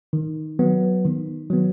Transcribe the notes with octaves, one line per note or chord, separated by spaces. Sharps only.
D#3
F#3 B3
D#3
F#3 B3